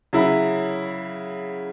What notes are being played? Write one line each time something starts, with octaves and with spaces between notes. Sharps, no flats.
C#3 F#3 E4